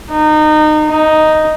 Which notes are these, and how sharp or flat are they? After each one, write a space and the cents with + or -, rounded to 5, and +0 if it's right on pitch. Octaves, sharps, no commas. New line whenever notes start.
D#4 -25
D#4 +0